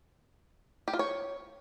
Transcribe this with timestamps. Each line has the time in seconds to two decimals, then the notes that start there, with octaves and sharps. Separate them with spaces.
0.88 G4
0.93 F4
0.99 C#5